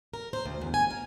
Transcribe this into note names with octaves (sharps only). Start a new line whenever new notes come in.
A#4
C5
D2
E2
G#5
A#4